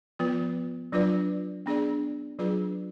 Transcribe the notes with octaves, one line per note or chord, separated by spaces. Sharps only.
F3 B3 F4 B4
F#3 D4 F4 B4 D5
B3 D4 G#4 D5
F#3 D4 F4 G#4 B4